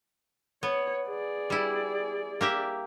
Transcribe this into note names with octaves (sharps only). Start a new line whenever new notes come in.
B3 C#5
G#4 D5
G3 E4
A#3 G4 E5